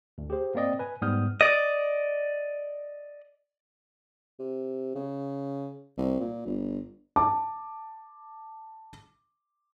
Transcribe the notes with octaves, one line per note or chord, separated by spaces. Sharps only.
D2
G4 G#4 C5
A#3 C4 D5 D#5 G5
B4 G#5
G#2 G3 B3 D#6 F6 G6
D5 D#5
C3
C#3
C2
A#2
G1
A5 D6